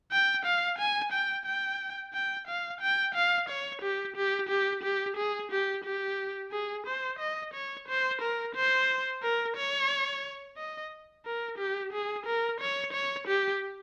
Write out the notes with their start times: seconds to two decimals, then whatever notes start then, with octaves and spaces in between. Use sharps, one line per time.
0.12 G5
0.45 F5
0.78 G#5
1.12 G5
1.46 G5
2.13 G5
2.47 F5
2.81 G5
3.15 F5
3.49 C#5
3.82 G4
4.16 G4
4.49 G4
4.83 G4
5.17 G#4
5.51 G4
5.84 G4
6.52 G#4
6.87 C5
7.19 D#5
7.54 C#5
7.88 C5
8.21 A#4
8.55 C5
9.23 A#4
9.57 C#5
10.57 D#5
11.25 A#4
11.58 G4
11.93 G#4
12.26 A#4
12.60 C#5
12.93 C#5
13.27 G4